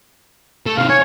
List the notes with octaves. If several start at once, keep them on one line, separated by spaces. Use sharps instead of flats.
A3
C3 D#3 F5
C#5 G#5